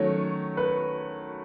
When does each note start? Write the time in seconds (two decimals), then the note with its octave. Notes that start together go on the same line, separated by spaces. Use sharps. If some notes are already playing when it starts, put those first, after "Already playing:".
Already playing: D#3 F#3 A3 C#4 C#5
0.57 B4